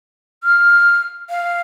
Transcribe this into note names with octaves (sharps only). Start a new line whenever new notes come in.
F6
F5